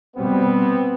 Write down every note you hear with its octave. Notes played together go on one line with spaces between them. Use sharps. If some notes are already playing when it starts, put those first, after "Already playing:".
B2 G3 B3 C4